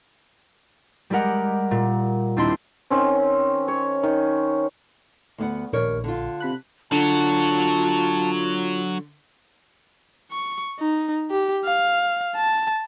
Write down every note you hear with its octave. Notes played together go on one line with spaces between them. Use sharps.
G3 G#3 G4 A#4 F#5
A#2
D#2 C4 D4 E4 C6
D#3 C4 C#4
C#5
D#3
D2 B3 F#5
A#1 D#2 A#4 C#5
D3 F4
C3 B5 F#6
D3 F#3 F4 F#4 A5
C#6
D#4
G4
F5
A5